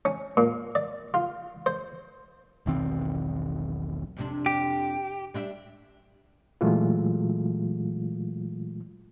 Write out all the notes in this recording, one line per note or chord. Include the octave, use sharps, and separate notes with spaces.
C#4
A#2
D5
F4
C5
E1 B1 D#3 C4
F2 C3 D4
G4
G3 D4 E5
A#2 E3 F#3 G#3 A3 F4